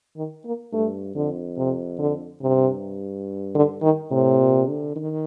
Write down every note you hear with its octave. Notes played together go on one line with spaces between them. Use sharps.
D#3
A#3
G2 A3
F2 D3
C3
D3
G2 C3
D3
D#3
A2 C3
A#2
D3
D#3